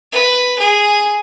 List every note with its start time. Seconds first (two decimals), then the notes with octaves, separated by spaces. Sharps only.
0.12 B4
0.58 G#4